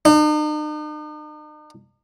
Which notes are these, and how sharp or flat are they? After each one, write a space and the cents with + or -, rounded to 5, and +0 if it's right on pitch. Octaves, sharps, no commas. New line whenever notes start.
D#4 -45